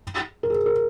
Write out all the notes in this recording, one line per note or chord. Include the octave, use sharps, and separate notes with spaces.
A#4
G#4
A#4